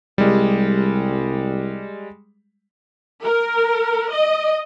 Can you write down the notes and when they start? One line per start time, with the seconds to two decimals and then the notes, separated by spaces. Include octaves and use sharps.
0.18 C2 G3 G#3
3.23 A#4
4.11 D#5